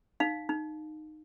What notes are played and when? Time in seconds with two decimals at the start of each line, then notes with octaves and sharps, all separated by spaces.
0.20 D#4 F5
0.49 D#4